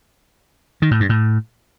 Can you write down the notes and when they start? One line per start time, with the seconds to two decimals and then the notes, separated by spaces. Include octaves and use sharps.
0.82 D#3
0.91 A2
1.00 G2
1.09 A2